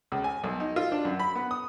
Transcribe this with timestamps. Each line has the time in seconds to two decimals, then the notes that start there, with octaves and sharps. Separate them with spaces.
0.12 C#2
0.24 G#5
0.44 B1
0.60 D#4
0.76 F4
0.92 D4
1.05 F#2
1.20 B5
1.36 B3
1.51 D#6